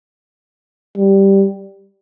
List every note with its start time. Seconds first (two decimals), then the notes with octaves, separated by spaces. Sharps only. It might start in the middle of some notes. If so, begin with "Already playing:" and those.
0.98 G3